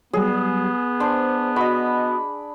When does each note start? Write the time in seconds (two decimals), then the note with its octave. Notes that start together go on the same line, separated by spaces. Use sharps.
0.13 F#3 G3 B3 G#4
1.00 D4 C5
1.56 F#4 D#5 B5